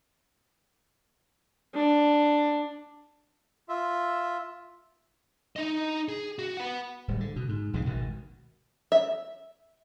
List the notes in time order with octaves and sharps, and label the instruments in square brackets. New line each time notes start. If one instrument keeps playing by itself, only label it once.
[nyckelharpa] D4
[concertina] F4 E5
[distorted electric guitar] D#4 D#5
G#4
F#4
B4 F#5
[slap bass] D1 G3
D3
B2
G#2
B1 F2 G#2 C#3
G#1 B2 D#3
[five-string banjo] E5